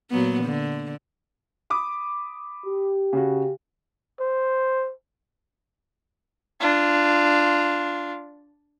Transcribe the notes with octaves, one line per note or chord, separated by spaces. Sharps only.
A#2 F#3 B3
D3
B5 D6 D#6
G4
C#3 F#4
C5
D4 F4